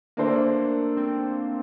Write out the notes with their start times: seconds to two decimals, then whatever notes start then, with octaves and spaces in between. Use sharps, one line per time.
0.17 D3 A3 A#3 D4 A4 C5
0.97 C4